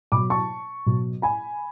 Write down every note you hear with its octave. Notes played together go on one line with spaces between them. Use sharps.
B2 F#3 B5 D6
A5 C#6
B2 F#3
G#5 B5